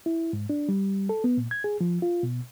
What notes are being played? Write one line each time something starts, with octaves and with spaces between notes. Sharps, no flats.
E4
G#2
D4
G3
A4
B3
A#2
G#6
G#4
F3
F4
B2